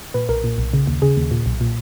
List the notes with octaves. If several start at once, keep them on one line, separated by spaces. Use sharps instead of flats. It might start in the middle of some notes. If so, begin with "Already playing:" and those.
A#2 B4
B1 A#4
A#2
B1
C#3
D#2
C#3 G#4
D#2
A#2
B1
A#2